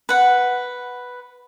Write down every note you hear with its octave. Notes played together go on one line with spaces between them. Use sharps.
B4 F#5